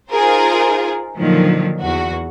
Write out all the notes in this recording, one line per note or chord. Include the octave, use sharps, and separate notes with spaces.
D#4 F4 G#4 A#4 C5
A#2 D3 D#3 F3 F#3
E2 F#4